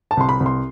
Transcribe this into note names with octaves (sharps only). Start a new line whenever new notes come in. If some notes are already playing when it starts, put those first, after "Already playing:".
A5
C2 C6
B5
C2
C6